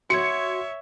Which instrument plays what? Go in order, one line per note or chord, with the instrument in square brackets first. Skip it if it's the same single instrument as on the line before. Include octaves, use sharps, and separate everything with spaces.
[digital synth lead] F#4 [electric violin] C#5 E5 [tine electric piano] C6 G#6 [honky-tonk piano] C#7